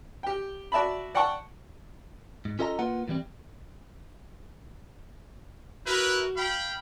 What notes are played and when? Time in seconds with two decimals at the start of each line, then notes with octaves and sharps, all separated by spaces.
0.23 G4 G5
0.72 F#4 D5 E5 A5 B5
1.15 D5 F#5 G5 A5 C#6
2.45 G#2
2.59 C#4 F4 A4 D#5 F#5 A#5
2.79 A#3 F4 B4 F#5
3.08 A2 E3 G3 C4
5.86 E4 F#4 A#4 B4
6.36 F5 G5 B5